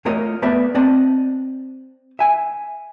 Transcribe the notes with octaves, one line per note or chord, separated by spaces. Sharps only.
A3 A#3 F4 A#4 C#5 D#5
A3 B3 B4 D5 E5
C4 D5 D#5 A5
E5 G#5